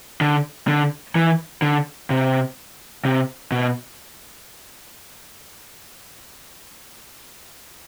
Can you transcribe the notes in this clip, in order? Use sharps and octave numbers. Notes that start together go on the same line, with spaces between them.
D3
D3
E3
D3
C3
C3
B2